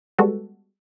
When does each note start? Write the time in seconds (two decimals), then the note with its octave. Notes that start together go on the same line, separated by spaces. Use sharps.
0.19 G3 G#3 B3 F#4 A4